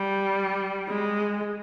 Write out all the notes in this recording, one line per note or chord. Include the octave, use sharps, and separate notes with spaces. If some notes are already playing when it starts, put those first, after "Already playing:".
Already playing: G3
G#3